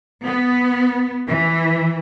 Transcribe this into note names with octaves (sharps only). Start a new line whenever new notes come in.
B3
E3